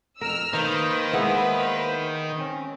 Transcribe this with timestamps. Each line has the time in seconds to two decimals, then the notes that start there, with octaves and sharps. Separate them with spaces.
0.21 F2 A#4 E6 F6
0.53 D#3 A#3 D#4 B4 C5
1.13 G#3 B3 E4
2.39 C4 C#4